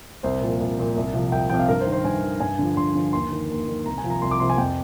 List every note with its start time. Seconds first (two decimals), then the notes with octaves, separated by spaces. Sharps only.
0.23 C2 C5
0.41 A#2 F3
0.60 C2
0.78 A#2 F3
0.96 C2
1.14 C3 F3
1.32 C2 G5
1.50 C3 F3 G5
1.59 F5
1.68 G2 A#4
1.81 C5
1.87 D#3
1.92 C5
2.04 G2 G#5
2.23 D#3
2.40 G2 G#5
2.58 D3 F3
2.77 G2 C6
2.95 D3 F3
3.13 D#2 C6
3.31 D#3
3.50 D#2
3.68 D#3
3.85 C2 A#5
3.98 G#5
4.03 C3 F3
4.10 A#5
4.22 C2 C6
4.31 D6
4.40 C3 F3 C6
4.50 G#5
4.58 F2 G5